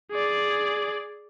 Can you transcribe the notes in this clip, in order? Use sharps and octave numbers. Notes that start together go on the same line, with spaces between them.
G#4 D5